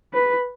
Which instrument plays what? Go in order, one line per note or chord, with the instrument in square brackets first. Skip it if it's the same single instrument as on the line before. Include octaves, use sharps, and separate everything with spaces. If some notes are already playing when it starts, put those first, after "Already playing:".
[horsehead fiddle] B4